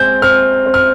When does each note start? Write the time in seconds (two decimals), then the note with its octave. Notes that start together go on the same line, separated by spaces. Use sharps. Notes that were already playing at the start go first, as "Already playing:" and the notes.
Already playing: G#3 C4 G6
0.22 C4 F6
0.66 C4
0.74 F6